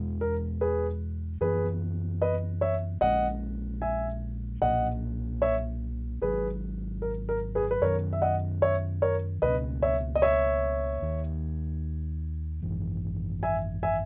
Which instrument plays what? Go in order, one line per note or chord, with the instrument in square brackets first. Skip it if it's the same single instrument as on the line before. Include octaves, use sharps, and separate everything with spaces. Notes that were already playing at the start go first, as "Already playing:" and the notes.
Already playing: [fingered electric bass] E2 B2 G#3
[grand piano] A#4
G#4 B4
[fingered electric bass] F#2 E3 B3 [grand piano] G#4 B4
[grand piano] B4 D#5
C#5 E5
[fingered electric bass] A#1 A#2 G#3 C#4 [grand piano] D#5 F#5
[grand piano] E5 G#5
[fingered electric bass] B1 A#2 A#3 [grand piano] D#5 F#5
[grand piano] C#5 E5
[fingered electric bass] G#1 G#2 F#3 [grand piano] G#4 B4
[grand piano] A#4
A#4
G#4 B4
B4
[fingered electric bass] F#2 D#3 F#3 C#4 [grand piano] A#4 C#5
[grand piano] E5
D#5 F#5
C#5 E5
A#4 C#5
[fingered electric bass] C#2 B2 A#3 C#4 [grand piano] B4 D#5
[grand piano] C#5 E5
D#5
C#5 E5
[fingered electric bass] D#2 D#3 A#3
G#1 F#2 E3
[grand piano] E5 G#5
E5 G#5